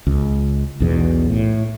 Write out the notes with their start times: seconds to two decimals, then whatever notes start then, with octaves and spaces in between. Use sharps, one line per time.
0.07 C#2
0.80 B1 E2 B2
1.30 A2